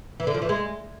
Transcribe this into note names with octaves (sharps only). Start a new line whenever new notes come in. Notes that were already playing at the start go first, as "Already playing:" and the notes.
E3
D3
F3
E3
G#3